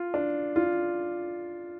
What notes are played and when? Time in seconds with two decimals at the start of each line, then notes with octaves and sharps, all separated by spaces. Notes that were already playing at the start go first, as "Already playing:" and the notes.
Already playing: F4
0.14 D4
0.56 F4